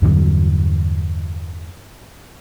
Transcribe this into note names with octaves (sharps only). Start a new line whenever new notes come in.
E2 G2 D3 F#3